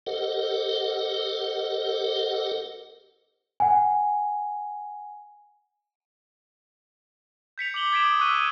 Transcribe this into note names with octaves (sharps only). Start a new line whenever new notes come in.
G4 A4 A#4 C5 D#5 F#5
F#5 G#5
G6 B6 C#7 F7
D6 C#7 F#7 G7
D6 G#6 B6 D7 E7
D#6
C#6 D#6 E6 F#6 D#7
D#7